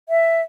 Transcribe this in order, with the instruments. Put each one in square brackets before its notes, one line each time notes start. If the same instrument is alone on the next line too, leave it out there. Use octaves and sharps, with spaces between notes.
[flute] E5